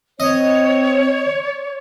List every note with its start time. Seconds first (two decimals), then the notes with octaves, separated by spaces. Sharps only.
0.20 C4 C#5 D#5